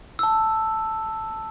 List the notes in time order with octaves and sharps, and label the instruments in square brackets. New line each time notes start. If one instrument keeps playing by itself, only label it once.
[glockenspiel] A5 E6